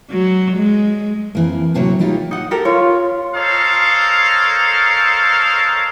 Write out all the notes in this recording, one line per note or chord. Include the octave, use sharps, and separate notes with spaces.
F#3
G#3
F2 E3 A#3
D2 A2 C3 F#3 A#3 C#5
G3 A#3 D#4 F4 G4
D#4 F#5
G4 A4 A#4
F4 C#5
A4 A#4 C5 C#5 D#5 F5